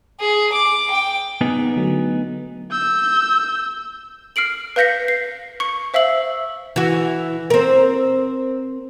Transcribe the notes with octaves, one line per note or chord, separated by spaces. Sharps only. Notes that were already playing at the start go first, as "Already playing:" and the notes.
G#4
D6
G5
B3 D#4 G#4
D3 F#3 A3
E6 G6
F6 C7 D7 F#7
B4 F5 G6 A#6 B6 C#7
C7
C#6 C#7
C5 E5 F5 E6 F#7
E3 F#4
C4 A#4